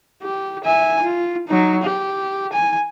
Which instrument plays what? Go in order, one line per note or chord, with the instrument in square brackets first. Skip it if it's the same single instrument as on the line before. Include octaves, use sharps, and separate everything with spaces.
[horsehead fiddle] G4
E5 G#5
F4
F#3 D#4
G4
G#5